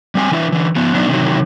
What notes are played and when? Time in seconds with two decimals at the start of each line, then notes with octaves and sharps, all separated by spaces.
0.15 G3 C4 G#5
0.32 E3 D4 E4 B4
0.52 D3 E3
0.76 F3 B3
0.95 F#3 B3 D4 D#4
1.08 C3 D#3 E3 F#3